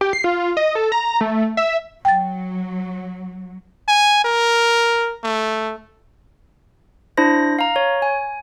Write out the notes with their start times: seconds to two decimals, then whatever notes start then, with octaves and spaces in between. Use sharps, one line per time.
0.01 G4
0.13 C7
0.24 F4
0.57 D#5
0.75 A4
0.92 A#5
1.21 A3
1.57 E5
2.05 F#3 G5 A6
3.88 G#5
4.24 A#4
5.24 A3
7.17 D4 E4 C5 A#6
7.59 F5 A#5
7.76 C#5
8.02 G#5